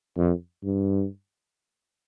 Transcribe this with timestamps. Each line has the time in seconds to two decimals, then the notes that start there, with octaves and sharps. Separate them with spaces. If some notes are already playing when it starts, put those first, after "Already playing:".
0.17 F2
0.64 G2